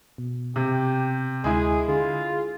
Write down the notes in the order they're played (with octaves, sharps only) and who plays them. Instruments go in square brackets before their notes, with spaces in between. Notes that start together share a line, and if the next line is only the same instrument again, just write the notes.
[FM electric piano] B2
[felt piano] C3 [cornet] G4
[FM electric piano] D2 [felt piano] G#3 E4 [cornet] G#4
[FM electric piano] D3 G#4 C6 [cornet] F4